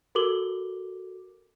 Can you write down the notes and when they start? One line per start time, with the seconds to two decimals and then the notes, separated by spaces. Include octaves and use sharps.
0.15 F#4 A4 A#4 D6 F#7 G7